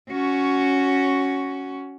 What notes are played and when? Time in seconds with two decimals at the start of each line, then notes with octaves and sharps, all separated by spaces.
0.10 C#4 F#4